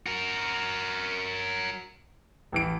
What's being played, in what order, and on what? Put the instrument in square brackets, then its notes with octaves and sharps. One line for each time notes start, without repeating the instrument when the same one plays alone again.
[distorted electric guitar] F#4 A#4
[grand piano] A1 E3 D7